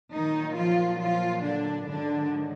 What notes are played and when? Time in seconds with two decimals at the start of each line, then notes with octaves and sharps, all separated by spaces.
0.13 A#2 D#3 F#3 D#4
0.57 F3 F4
1.01 F3 F4
1.44 D3 D4
1.88 G#2 D3 D#3 F#3 D4